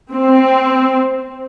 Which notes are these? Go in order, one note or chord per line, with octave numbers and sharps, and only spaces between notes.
C4